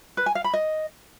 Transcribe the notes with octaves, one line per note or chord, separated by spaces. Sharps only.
B4
G#5
F5
B5
D#5